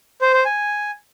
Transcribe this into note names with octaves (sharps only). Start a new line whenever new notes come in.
C5
C5
G#5